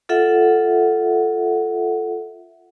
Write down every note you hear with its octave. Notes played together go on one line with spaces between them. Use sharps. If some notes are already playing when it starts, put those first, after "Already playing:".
F4 A4 E5 F#5